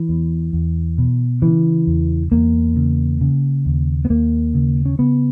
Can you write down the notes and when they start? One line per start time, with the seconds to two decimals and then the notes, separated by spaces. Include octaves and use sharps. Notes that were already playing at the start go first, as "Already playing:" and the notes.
Already playing: E3
0.09 E2
0.53 E2
0.98 B2
1.42 C#3 E3
1.87 E2
2.32 E2 A#3
2.76 C#3
3.21 C#3
3.66 D#2
4.05 B3
4.10 D#2 A#3
4.54 C#3
4.85 C#4
4.99 C#3 B3